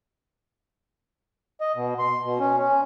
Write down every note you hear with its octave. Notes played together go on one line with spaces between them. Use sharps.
D#5
B2
C6
B2
C#4
C#4